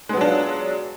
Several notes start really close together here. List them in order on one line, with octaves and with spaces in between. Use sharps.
G#3 B3 F#3 D4 F4